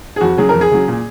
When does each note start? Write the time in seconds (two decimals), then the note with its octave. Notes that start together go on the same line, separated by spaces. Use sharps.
0.16 G#4
0.21 F2 F#4
0.37 C#3 F#3 G#4
0.49 A#4
0.54 F2
0.61 G#4
0.71 C#3 F#3
0.88 A#2